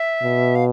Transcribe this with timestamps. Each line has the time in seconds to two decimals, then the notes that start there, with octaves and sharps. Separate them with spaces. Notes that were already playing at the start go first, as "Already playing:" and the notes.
Already playing: E5
0.22 B2
0.55 F5